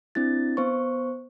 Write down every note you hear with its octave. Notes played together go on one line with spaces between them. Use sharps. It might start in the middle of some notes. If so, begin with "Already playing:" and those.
C4 D4 E4 A6
B3 C5 C#6